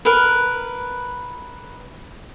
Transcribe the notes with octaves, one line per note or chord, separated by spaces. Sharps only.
A#4 B4